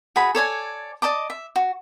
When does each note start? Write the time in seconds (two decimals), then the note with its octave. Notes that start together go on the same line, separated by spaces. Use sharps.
0.16 F#4 G#4 B5
0.35 A4 C#5 D5 G#5
1.02 D5 D#5 A5 D6
1.30 E5
1.56 F#4